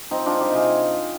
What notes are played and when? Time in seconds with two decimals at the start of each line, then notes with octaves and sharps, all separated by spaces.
0.11 F3 C4 D#4
0.26 D4 F4
0.32 G#3
0.41 D#4 G4
0.51 C3 F4 G#4